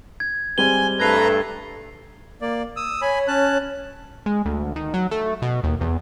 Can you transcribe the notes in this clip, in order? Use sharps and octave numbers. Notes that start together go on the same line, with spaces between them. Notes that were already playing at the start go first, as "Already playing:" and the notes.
G#6
G3 G#3 C4 G#5 G7
G2 A3 A4 B4 A#5 G#6 C7
A#3 D5
D#6 E6
C#5 G#5 B5
C#4 A5 F#6
G#3
D2
D#3
F#3
A3
B2
D#2
E2